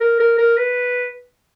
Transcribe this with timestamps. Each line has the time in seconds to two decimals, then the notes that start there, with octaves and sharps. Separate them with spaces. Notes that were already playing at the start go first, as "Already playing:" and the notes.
0.01 A#4
0.20 A#4
0.38 A#4
0.57 B4